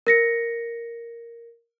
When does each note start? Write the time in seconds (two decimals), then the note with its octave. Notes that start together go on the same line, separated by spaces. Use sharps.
0.07 A#4 A#6 C#7